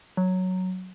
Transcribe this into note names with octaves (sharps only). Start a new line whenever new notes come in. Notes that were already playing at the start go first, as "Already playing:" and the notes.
F#3